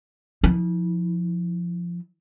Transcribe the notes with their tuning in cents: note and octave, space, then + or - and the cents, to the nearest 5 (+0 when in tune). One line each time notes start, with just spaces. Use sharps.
F3 +0 E4 -35